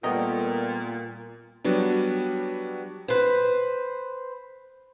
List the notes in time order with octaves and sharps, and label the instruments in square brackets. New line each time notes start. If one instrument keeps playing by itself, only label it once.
[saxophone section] A#2 [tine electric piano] G3 B3 G5 [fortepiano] A3 A#4 D#5
[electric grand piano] F#3 G3 B3 D4
[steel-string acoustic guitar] B4 C5